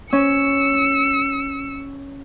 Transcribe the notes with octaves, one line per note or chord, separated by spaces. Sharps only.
C#4 E6 C#7